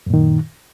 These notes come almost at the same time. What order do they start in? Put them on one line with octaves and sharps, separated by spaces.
F#2 A#2 D#3